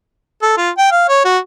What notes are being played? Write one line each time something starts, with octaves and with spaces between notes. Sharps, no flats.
A4
F4
G5
F5
C#5
F#4